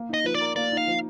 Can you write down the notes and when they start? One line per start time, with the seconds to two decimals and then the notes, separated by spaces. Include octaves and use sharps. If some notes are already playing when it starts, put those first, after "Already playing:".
Already playing: A#3
0.09 D#4 D#5
0.24 F3 B4
0.34 D5
0.41 A#4
0.56 A#3 D5
0.72 D#4
0.77 F5
0.87 F3